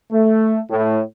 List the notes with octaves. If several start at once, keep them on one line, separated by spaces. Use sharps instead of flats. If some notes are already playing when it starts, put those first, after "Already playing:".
A3
A2